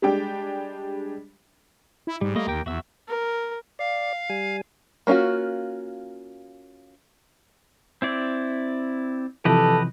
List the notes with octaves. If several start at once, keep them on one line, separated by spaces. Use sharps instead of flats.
G3 G#3 D4 G4 G5
E4
G#2 G3
G3 A3 A#3 D#5
D#2 G4 A#4 G5
E2 F#4 E5 E6
A#4
D5 F5
G3 G#5
A#3 C#4 D4 F4 F#4
C4 E4 D5
C3 E3 F3 G4 A4 B4 D#5